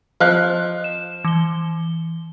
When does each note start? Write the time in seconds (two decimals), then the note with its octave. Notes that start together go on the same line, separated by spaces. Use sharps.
0.20 F3 D#5 F5 F#6
0.84 E7
1.24 E3 G7